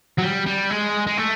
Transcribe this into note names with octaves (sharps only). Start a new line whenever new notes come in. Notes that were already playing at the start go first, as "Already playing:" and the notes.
F#3
G3
G3
G#3
G#3
A3